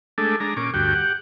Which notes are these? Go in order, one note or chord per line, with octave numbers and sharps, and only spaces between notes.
G#3 A3 D4 A4
G#3 D4 A#5
A#2 C#4 D6
D2 G2 F#4 G5
G4 F#5